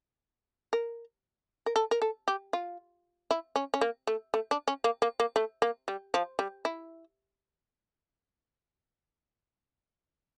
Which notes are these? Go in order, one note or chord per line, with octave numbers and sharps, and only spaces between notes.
A#4
A#4
A4
A#4
A4
G4
F4
E4
C#4
C#4
A#3
A3
A3
D4
C#4
A#3
A#3
A#3
A3
A#3
G3
F3
G3
E4